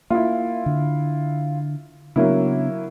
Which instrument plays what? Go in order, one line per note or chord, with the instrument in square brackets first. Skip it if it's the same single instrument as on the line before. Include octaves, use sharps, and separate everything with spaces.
[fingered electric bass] A#3 [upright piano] E4 F4
[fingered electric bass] D3
[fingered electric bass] C#3 B3 D4 [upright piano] F#3 A#3 E4